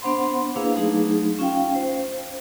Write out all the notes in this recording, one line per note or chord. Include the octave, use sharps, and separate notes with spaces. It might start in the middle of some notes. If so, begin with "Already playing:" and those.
B3 D4 C5 F#5 B5 C6
A#3 D4 E4 G#4 B4 F5
F#3 A3 D#4 G#4
C#4 F4 F5 G5
C5